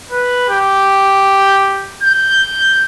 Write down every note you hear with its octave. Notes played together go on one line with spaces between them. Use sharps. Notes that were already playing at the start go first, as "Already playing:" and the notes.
B4
G4
G6